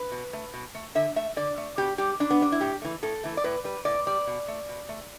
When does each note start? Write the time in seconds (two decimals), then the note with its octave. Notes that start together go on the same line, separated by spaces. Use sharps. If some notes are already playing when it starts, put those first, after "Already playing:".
Already playing: B4
0.12 B2
0.33 A3
0.54 B2
0.75 A3
0.95 D3 E5
1.16 A3 E5
1.37 D3 D5
1.58 A3
1.78 B2 G4
1.98 G3 G4
2.20 B2 D4
2.30 B3
2.41 G3 D4
2.52 E4
2.61 A2 G4
2.82 E3 A3
3.03 A2 A4
3.24 E3 A3
3.37 D5
3.44 A2 B4
3.64 G3 B4
3.85 A2 D5
4.07 G3 D5
4.27 B2
4.48 A3
4.69 B2
4.89 A3